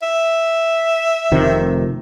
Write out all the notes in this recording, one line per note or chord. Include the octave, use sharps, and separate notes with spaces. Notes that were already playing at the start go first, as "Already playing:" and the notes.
E5
F1 C3 D#3